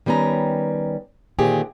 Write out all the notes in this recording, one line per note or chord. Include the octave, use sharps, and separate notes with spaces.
D#3 G3 B3 C#4 A#5
A#2 D3 D#3 C4 G4 G#4